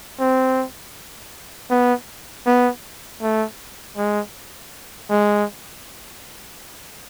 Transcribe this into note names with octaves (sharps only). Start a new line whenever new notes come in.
C4
B3
B3
A3
G#3
G#3